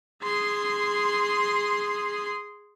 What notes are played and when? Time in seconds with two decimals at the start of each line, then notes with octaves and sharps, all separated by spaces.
0.23 G#4 C6